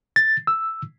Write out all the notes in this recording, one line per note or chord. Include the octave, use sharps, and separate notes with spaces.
A6
E6